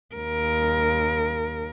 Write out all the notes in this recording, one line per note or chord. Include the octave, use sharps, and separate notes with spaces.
D#2 A#4